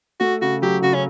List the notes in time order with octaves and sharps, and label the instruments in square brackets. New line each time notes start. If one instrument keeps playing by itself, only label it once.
[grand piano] A3 [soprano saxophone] F#4
[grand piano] C#3 [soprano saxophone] F#4
[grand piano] F#3 [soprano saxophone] G4
[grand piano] C#3 [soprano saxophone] F#4
[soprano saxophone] C#4